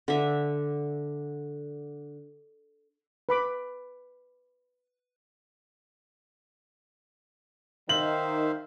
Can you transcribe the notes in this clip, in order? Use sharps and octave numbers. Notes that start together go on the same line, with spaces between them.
D3 E5
B4 B5 D6
D#3 C5 E5 F5 F#7